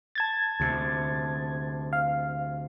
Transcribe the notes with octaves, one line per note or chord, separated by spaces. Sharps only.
A5 G#6 A6
D2 C3
F5